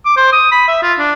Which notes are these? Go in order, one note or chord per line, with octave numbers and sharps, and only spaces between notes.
D6
C5
D#6
B5
E5
F4
D4